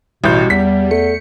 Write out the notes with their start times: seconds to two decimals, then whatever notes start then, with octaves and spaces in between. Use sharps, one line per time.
0.24 A1 B2 G3 G6
0.50 E2 B6
0.91 A3 C#7